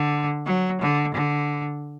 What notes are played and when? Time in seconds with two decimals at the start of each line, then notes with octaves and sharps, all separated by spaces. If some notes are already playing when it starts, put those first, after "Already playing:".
Already playing: D3
0.45 F#3
0.81 D3
1.14 D3